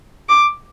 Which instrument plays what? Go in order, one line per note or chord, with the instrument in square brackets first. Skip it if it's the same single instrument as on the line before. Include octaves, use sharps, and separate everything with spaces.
[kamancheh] D6